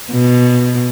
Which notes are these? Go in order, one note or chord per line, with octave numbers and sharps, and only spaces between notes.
B2